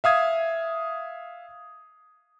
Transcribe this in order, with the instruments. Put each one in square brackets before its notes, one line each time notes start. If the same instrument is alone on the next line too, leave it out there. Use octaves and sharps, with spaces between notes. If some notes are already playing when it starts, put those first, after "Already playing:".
[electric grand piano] E5 F5 D#6 G#6